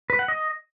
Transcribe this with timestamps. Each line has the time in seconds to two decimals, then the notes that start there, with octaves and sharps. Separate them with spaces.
0.10 B4
0.19 F#5
0.28 D#5